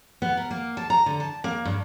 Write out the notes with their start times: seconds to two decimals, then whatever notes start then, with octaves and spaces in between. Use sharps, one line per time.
0.22 B3
0.37 A#4
0.51 A#3
0.77 A5
0.90 A#5
1.06 D3
1.20 A5
1.44 A#3
1.65 G2